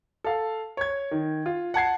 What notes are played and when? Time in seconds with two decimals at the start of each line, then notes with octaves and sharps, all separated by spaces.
0.24 A4 F5
0.77 C#5 G#6
1.11 D#3
1.46 F4
1.74 F#5 A5 G#6 C7